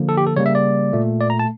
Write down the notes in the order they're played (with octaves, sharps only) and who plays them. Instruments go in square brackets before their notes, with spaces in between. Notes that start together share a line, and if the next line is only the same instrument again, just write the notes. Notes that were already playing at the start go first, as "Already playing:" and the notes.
Already playing: [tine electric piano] D3 F3 A#3
A4
G4
A4
C#3 G3 A#3 C#5
E5
D5
A#2 A3
D5
A#5
A5